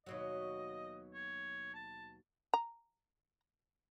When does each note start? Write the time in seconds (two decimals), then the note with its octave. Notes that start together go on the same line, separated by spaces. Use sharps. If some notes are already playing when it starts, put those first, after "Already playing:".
0.06 D#2 B2 F#3 D#5
1.14 C#5
1.74 A5
2.54 A#5